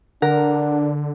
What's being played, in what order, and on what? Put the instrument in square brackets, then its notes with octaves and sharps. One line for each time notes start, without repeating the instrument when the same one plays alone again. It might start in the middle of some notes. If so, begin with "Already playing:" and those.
[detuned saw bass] D3 [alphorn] D4 [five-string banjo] A#4 [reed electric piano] F#5